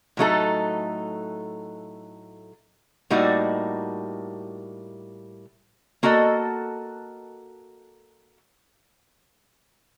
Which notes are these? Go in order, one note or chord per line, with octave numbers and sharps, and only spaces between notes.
A2 F#3 A3 D#4 A4
A2 G3 A#3 D#4 F#4
A#3 F#4 A4 D#5